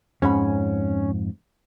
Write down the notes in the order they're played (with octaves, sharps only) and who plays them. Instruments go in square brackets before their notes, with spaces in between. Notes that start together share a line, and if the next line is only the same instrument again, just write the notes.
[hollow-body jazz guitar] F2 G#2 B5 [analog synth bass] C#4